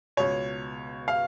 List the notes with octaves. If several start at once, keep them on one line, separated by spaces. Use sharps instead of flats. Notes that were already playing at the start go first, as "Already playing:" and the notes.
C#2 B2 C#5
F5